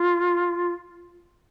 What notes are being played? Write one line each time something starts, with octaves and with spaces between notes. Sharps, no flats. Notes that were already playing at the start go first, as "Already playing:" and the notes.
Already playing: F4